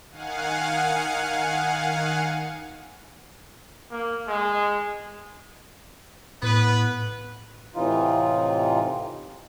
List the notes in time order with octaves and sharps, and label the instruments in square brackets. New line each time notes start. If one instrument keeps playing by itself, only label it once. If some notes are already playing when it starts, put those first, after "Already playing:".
[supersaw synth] D#3 F5 F#5 G#5
[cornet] A#3
G#3
[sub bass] A2 [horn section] B3 B4
[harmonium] A2 C3 E3 D#4 F4